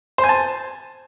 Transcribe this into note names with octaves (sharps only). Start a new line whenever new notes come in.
C5
G#5
A5